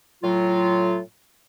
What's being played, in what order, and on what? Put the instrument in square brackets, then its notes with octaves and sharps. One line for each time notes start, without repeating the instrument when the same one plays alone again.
[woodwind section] A2 F#3 F4